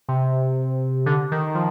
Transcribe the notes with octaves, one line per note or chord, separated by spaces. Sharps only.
C3
D3
D#3
F3